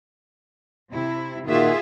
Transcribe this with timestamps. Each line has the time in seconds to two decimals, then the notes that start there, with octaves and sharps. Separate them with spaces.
0.91 C3 E4
1.48 A#2 D#3 F4 F#4 G#4 E5